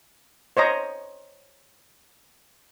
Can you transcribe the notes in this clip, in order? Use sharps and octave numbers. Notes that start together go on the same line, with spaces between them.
C5 C#5 D#5 A#5